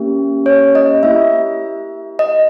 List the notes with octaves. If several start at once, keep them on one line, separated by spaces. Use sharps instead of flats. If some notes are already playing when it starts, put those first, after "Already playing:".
Already playing: A#3 C#4 G4
C#5
D#5
A#3 E4 G4 E5
D#5